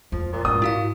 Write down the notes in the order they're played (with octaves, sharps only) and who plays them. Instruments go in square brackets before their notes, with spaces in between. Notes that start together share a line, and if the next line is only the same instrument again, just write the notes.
[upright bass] F2 [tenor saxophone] F3
[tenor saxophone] A#2
[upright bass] G#2 [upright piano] D#6
[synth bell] E4 F#4 F5